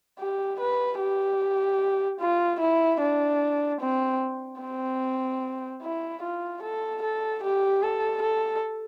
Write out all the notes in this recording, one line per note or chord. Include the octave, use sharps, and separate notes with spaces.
G4
B4
G4
F4
E4
D4
C4
C4
E4
F4
A4
A4
G4
A4
A4